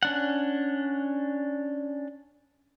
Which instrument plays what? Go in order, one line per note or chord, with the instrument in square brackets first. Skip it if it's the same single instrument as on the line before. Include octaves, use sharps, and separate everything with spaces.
[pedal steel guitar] C#4 D4 F#5